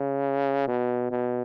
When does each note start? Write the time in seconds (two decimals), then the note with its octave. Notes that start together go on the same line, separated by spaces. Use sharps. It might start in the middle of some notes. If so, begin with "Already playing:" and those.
Already playing: C#3
0.68 B2
1.11 B2